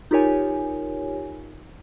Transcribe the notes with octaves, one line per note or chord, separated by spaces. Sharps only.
D#4 F4 G4 A#4 C#5 G#5